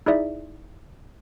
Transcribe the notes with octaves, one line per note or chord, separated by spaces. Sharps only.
D#4 E4 G#4 D5 E5